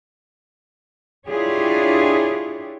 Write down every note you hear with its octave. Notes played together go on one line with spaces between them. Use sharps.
D4 E4 F4 G4 G#4 C#5